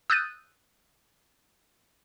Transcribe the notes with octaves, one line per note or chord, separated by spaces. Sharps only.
D#6 E6 F#6 G6 A6 D#7